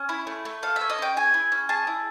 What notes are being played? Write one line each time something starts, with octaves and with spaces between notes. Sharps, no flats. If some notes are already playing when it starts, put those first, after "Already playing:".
Already playing: C#4
E4
A3
A3
A4 F5
E5
C#4
D#5
C#4 G5
G#4 G#5
E4
C#4
G#4 A5
E4